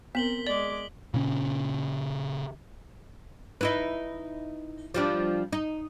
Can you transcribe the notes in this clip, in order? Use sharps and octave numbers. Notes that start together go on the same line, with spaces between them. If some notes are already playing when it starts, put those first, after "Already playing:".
B3 C4 A#4 B6 F#7 G7
G#3 D5 D6 F#7
A#2 C#3 C#4
D#4 E4 B4
F3 G3 D4
D#4